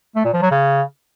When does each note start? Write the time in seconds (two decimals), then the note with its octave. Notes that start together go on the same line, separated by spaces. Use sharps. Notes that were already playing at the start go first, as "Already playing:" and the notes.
0.15 A3
0.24 A#2
0.33 F3
0.42 F#3
0.51 C#3